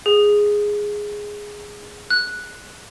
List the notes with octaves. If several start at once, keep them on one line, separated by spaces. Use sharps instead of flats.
G#4
F#6